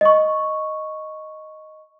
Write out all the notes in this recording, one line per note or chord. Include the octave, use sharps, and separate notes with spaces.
D#5 C#6